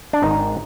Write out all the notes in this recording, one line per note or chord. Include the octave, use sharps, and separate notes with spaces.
D4
G#1 G#2 D#3 D#4